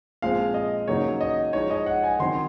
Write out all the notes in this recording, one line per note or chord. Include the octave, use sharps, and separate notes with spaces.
A#2 F3 G#3 C4 F5
D#5
C#3 F#3 A#3 D#4 C#5
D#5
F3 G#3 D#4 C#5
D#5
F#5
G#5
D#3 F#3 C4 D#4 C6